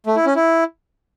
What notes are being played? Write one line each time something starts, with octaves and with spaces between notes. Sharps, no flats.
A3
E4
C#4
E4